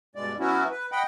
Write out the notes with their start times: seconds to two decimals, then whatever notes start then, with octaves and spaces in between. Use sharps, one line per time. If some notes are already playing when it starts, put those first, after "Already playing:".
0.16 G2 B2 G#3 D5
0.39 F#3 B3 C#4 E4 F#4
0.71 B4
0.92 D#5 F#5 G5 B5